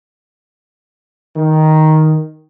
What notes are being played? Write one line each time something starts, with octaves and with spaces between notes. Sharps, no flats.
D#3